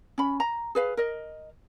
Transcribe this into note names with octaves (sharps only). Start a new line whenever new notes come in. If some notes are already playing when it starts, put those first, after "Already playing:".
C#4 B5
A#5
G#4 B4 F5
A#4 D#5